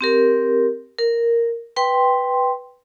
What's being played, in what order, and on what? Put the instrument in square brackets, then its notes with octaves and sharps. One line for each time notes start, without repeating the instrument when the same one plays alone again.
[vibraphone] C4 G4 A#4
A#4
B4 G5 C6